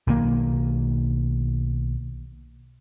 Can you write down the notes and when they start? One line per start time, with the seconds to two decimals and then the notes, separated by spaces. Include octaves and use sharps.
0.07 B1 D#3 A#3